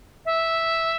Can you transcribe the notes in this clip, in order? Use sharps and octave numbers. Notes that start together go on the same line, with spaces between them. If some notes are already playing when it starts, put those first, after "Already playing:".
E5